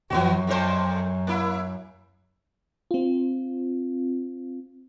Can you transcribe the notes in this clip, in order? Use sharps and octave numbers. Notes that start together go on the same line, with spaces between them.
F#2 E3 B3 F#4
F2 A#2 C5
A#3 E4
C4 F4